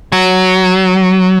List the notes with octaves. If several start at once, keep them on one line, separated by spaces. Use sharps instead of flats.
F#3